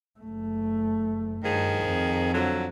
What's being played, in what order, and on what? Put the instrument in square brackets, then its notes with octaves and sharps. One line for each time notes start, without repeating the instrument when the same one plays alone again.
[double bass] F#1 A3
[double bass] G2 [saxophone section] D#3 F3 G#4
[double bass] F2
[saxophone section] D3 F3 F#3